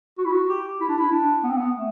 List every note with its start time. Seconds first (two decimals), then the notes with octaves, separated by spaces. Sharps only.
0.18 F#4
0.25 E4
0.32 F#4
0.49 G4
0.81 E4
0.89 D4
0.98 E4
1.11 D4
1.44 B3
1.50 C4
1.57 B3
1.75 A3